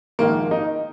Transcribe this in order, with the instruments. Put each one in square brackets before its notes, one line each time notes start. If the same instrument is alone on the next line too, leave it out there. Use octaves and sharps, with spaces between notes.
[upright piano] A#1 G#2 D#3 A#3
D#4